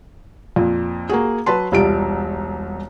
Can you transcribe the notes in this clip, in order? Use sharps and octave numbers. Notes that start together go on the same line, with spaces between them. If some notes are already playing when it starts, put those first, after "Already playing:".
F2 A#2
A#3 F#4 G#4
F#3 B4 A5 C6
E1 C2 G3 F4 D7